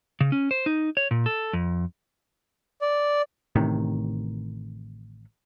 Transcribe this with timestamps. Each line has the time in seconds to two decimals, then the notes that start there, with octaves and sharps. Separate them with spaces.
0.21 C#3
0.32 C#4
0.51 C5
0.66 D#4
0.97 C#5
1.11 A#2
1.26 A4
1.53 F2
2.82 D5
3.56 A1 A2 C3 D#3